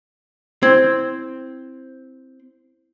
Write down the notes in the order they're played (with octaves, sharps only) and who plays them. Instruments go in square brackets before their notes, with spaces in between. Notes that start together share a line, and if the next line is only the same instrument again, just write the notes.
[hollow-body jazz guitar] C4 [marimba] E4 G#6